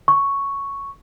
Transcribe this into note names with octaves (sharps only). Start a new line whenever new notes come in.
C#6